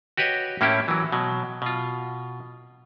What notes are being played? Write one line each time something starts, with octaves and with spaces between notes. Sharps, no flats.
F#4 G4 B4 C#5 D#5
A2 A#3 C#4 E4 G4
E3 F#3
B2 F#3
B2 F4